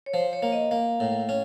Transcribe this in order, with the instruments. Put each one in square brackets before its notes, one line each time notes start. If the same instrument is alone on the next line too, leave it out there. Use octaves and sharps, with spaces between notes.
[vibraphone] C#5
[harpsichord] F3 [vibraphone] C5
[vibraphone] C#5
[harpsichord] A#3
[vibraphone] D#5
[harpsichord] A#3 [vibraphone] F5
[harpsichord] A2
C#4